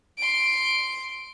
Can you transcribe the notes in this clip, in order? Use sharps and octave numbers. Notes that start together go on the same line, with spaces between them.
C6 D7